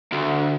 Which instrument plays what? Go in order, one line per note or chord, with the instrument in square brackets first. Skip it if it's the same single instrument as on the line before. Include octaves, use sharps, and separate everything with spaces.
[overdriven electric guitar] D2